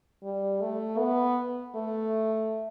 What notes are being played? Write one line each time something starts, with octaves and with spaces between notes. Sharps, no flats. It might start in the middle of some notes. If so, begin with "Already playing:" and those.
G3
A3
B3
A3